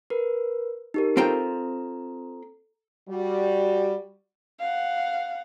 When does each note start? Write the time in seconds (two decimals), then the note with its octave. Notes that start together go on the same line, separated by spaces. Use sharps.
0.10 A#4 B4
0.94 D#4 G4 A#4
1.17 C4 F4 A4 G5 A#5
3.09 G3 F#4
4.60 F5 F#5